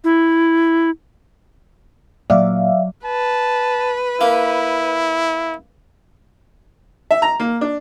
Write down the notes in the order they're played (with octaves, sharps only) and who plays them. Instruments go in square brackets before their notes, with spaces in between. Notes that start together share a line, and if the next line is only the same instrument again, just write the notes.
[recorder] E4
[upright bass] A#2 [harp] F#3 D6 [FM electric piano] D5 E5 F5
[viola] B4 [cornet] A5
[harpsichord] A#3 [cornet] E4
[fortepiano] E5
A#5
A#3
D4